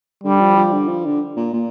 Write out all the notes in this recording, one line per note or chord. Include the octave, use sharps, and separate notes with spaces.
D3 G3
F3
F3
D3
F3
D3
A#2
A#2